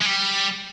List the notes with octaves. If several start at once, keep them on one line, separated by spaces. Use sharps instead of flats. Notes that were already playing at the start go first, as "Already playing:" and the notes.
G#3
G3